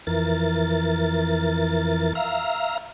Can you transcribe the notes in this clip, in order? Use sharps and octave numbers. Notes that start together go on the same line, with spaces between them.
F2 E3 A#4 A6
E5 F5 A#5